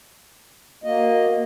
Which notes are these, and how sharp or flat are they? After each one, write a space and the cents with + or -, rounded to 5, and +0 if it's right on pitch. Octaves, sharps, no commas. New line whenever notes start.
A#3 +0 F#4 -20 D#5 +0